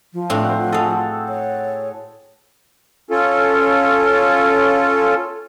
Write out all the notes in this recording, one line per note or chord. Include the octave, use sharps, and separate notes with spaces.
F3
A2 C4 D4
C5 F#5
F#4 G#4 A4 D#5 F5
C#5
C#4 F4 A4